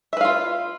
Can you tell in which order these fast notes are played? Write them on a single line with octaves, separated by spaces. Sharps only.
E5 B4 F5 F4